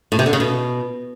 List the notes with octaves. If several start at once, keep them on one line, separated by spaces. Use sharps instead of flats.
A2
C3
D3
C#3
B2